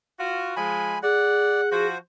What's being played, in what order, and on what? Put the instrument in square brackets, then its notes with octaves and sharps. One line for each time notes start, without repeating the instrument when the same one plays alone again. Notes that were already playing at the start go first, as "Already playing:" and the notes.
[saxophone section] F4 F#4
[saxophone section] F3 G#3 [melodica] G#5 B5
[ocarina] G#4 [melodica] D5 [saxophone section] F#5
[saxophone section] F3 F#4 [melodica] C5